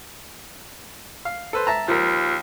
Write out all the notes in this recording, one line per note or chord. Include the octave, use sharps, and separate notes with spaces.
F5
A4 B4 C5
E5 A5 A#5
D#2 F3 F4 A#4